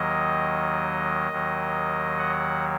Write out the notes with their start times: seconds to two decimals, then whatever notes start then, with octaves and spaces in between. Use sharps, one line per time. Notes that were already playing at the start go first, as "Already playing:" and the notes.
Already playing: D#2 D#3 F#3 D#5
1.31 D#2 D#3 F#3
2.19 F#5